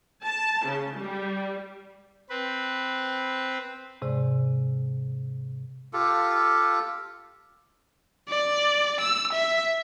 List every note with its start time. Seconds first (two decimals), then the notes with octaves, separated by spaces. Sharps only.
0.24 A5
0.66 C#3
0.97 G3
2.29 C4 B4
4.02 G#2 C3 G#3 D5
5.93 F4 G4 A4
8.29 D5
9.00 E6
9.33 E5